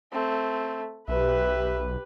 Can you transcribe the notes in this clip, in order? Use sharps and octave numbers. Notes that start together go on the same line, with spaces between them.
A3 C4
B1 G4 B4 E5